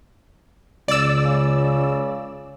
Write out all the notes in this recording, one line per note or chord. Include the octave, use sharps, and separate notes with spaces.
C#2 D5 E6
C#3